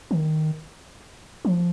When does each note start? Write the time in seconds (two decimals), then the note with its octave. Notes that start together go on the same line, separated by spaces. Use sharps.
0.11 D#3
1.45 F3